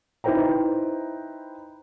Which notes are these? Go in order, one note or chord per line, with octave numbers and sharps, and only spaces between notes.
D#4 E4 B4 C5 G5 A#5